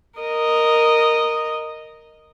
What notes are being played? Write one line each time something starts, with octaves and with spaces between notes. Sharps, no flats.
A#4 D#5